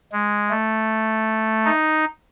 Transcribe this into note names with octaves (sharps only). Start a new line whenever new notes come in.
G#3
A3
D#4